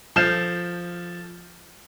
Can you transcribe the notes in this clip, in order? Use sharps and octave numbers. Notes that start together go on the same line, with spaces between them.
F3 A4 F6 G6 C7 E7